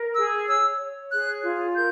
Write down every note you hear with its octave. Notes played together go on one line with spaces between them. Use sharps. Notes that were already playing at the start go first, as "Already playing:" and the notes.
Already playing: A#4
G#4 E6
C#5 E6
C#5
G#4 F#6
F4
A#4 G6